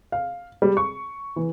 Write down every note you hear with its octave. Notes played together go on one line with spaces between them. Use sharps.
F5
G3
C#6
E3